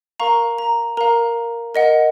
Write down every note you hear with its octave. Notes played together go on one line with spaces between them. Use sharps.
A#4 F5 A#5 C#6
A#5
A#4 F5 A#5
A#4 D#5 F#5